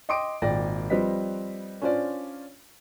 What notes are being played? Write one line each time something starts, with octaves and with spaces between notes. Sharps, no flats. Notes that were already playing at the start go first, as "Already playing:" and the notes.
D#5 G5 C6 D6 D#6 D7
G#1 A#2 D5 G5 A#6
F3 G3 C4 B4 D#5 B6
C#4 D4 F4 C5 D5